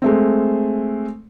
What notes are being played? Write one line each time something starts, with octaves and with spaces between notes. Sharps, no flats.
G#3 A3 C4